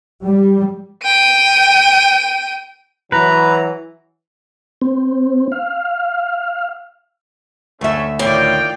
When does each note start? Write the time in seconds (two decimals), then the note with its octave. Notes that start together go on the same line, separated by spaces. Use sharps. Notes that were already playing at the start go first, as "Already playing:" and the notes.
0.24 G3
1.03 G5 D#7
3.12 E3 F#3 B4 A#5
4.82 C4
5.52 F5
7.81 D2 A3 C#4 E5
8.19 A2 D#3 F4 D5 G5